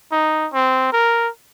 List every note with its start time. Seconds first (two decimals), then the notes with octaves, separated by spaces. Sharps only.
0.12 D#4
0.53 C4
0.93 A#4